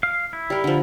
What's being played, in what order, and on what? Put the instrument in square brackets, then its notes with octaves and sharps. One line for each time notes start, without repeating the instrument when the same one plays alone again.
[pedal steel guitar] F5
E4
[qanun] G3 A#4
D3 F3